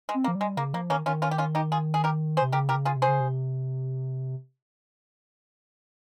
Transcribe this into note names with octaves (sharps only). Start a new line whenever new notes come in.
G#3
C4
A#3
F3
G3
G#3
C#3 A#3
F3 A#3
D#3 A#3 C#4
D#3 C#4 F4
C#4 F4
G4
C#4 F4
D#4 G4
F4 G#4
G#4
G4 A#4
G#4 C5
C3
C#3 G4 A#4
C3 G4 A#4
C#3
F4 G#4
C3
G#4 C5
C#3
C3